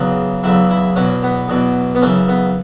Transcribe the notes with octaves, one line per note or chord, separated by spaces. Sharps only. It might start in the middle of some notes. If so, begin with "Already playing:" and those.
Already playing: E2 C#3 F#3
E2 C#3 F#3 E4
E4
E2 B2 F#3 C#4
B3
E2 B2 F#3
B3
F#2 C#3 E3 C#4
B3